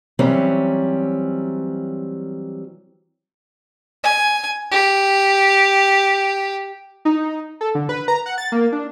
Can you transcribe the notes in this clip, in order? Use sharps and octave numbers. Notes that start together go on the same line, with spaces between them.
E3 F#3 G3 C4 C#4
G#5
G4
D#4
A4
D3
B4
A#5
F#5
A6
A#3
D4